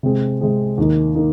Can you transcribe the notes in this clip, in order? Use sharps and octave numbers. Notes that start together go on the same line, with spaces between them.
C3 G#3 C4 G#4
C3 G#3 C4 G#4
D#2 D#3 A#3 D#4
D#3 A#3 D#4